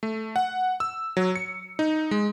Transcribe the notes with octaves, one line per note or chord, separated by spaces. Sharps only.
A3
F#5
E6
F#3
C#7
D#4
G#3